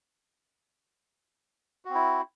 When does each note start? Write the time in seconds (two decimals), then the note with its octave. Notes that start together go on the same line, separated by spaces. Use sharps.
1.85 F#4
1.90 C4
1.95 E4